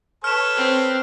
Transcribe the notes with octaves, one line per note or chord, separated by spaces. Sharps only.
A4 B4 C#5 F6 E7
C4